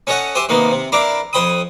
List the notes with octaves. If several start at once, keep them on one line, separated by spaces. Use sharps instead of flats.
C#4 A4 C#5 D#5 F#5
G4 C5 E5 G#5
C3 D#3 A#3 B3
C3
D4 E4 A#4 F5 D6
F2 C5 G5 B5 D#6